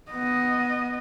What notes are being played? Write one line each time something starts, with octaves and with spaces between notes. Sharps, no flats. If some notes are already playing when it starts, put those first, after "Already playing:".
B3 D#5